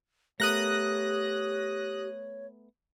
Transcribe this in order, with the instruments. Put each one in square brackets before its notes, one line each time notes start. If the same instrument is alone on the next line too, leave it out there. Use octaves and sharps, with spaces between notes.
[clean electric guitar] A3 B3 A#4 [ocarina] G4 [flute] C#5 [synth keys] D#6 F#6 A#6